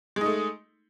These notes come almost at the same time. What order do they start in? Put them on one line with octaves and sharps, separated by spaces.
G#3 D#4 A3